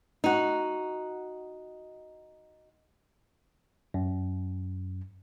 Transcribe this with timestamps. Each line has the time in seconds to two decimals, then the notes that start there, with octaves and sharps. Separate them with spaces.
0.24 D#4 F#4
3.94 F#2